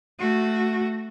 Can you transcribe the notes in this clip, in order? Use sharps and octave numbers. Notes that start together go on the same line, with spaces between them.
A3 F#4